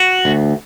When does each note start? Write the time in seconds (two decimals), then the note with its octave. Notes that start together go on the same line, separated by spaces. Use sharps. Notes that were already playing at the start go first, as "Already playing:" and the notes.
Already playing: F#4
0.25 D2